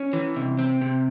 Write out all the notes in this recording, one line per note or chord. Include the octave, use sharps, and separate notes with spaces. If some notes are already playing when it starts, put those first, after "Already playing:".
Already playing: C#4
E3
C3
C4
C3